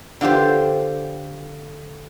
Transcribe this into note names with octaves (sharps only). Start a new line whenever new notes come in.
D3 F4 G4 C5